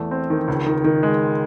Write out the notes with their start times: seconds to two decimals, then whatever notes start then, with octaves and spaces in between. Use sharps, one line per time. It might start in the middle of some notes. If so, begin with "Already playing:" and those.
Already playing: E2 A3
0.11 C4
0.30 D#3
0.48 C#2
0.66 D#3
0.84 D#3
1.03 G#3